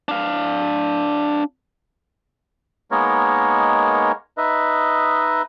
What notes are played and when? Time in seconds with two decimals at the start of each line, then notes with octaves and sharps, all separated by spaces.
0.09 D4 F5
2.91 G#3 A#3 B3 D#4 A#4 C#5
4.38 D#4 B4 D#5 E5